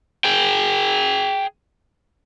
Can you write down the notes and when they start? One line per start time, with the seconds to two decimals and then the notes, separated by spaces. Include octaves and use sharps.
0.24 G#4 G5